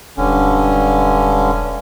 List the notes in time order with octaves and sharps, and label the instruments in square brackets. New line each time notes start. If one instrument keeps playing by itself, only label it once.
[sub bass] E1 [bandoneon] G2 D3 C#4